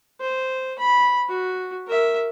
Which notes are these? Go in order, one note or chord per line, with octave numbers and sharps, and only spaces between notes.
C5
B5
F#4
A#4 E5